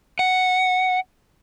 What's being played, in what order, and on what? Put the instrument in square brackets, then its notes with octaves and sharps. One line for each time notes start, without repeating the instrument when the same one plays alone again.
[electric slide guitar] F#5